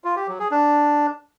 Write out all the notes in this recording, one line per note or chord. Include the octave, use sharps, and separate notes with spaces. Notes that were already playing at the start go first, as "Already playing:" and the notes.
F4
G4
F#3
G#4
D4